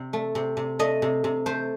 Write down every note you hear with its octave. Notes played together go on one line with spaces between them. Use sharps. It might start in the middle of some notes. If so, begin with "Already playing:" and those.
Already playing: C3
A3
C3
C3
A3 D#5
C3
C3
A3 C5